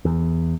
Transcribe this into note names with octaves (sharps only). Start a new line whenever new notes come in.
E2